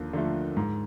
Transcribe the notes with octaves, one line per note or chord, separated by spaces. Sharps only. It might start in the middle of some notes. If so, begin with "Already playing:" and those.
Already playing: D#2 D3 F3
D3 F3 A3
G#2